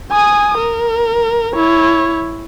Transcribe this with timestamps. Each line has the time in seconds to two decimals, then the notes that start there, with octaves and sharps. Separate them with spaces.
0.12 G#5 D#6
0.57 A#4
1.55 E4 C#5